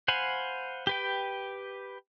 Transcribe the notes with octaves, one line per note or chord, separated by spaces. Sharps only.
C5 F5 F#5 G#5 B5
G4 B4 G5